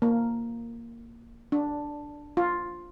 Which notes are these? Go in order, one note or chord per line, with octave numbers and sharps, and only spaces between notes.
A#3
D4
F4